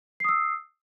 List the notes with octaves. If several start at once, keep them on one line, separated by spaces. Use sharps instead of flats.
D#6 E6 C7